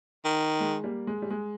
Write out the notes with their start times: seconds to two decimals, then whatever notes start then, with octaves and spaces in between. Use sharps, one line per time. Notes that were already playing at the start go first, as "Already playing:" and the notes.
0.25 D#3
0.60 G#3
0.83 G3 A#3
1.07 G#3
1.22 G3
1.30 G#3